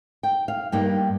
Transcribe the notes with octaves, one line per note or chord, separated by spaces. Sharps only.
G5
F5
G2 G3 A#3 D#4 G5